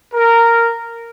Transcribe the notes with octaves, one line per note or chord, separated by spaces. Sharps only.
A#4